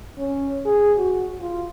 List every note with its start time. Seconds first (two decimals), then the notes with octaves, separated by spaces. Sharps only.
0.19 C#4
0.66 G#4
0.97 F#4
1.40 F4